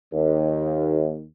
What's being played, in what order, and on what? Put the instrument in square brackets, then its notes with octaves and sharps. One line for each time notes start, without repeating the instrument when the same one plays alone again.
[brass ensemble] D#2